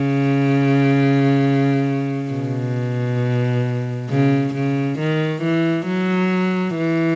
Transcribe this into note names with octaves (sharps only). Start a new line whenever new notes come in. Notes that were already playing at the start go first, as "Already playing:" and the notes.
Already playing: C#3
B2
C#3
C#3
D#3
E3
F#3
E3